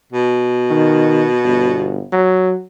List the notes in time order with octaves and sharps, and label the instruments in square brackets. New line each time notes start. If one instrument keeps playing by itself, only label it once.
[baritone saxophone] B2
[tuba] D#3
G1
F#3